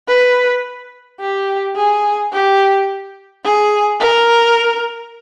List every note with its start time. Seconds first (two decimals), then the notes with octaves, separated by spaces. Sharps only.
0.08 B4
1.20 G4
1.76 G#4
2.33 G4
3.44 G#4
4.00 A#4